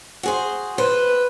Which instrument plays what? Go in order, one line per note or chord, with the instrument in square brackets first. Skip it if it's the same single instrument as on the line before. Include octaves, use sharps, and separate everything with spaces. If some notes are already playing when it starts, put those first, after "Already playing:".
[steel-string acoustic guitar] F#4 G#4 C5
[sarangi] B4 [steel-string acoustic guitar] C5